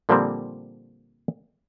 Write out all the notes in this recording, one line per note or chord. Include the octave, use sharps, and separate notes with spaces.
A#2 D3 F3 G3 A#3 C4